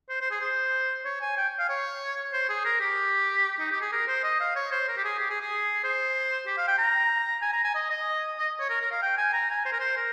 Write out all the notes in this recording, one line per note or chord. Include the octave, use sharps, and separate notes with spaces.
C5
C5
G#4
C5
C#5
G#5
G5
F5
C#5
C5
G#4
A#4
G4
D#4
G4
G#4
A#4
C5
D#5
F5
C#5
C5
A#4
G4
G#4
G4
G#4
G#4
C5
G4
F5
G5
A#5
G#5
A#5
G#5
D#5
D#5
D#5
C#5
A#4
A#4
F5
G5
G#5
A#5
G#5
C5
A#4
C5
A#4